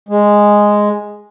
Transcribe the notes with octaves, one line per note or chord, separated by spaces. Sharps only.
G#3